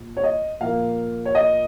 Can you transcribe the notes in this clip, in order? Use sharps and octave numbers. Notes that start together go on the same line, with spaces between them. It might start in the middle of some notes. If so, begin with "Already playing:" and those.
Already playing: A#2
C#5
D#5
A#2 F3 A#3 F5
C#5
D#5